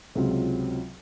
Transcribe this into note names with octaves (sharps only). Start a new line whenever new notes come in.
C#2 C3 F#3 C4 F4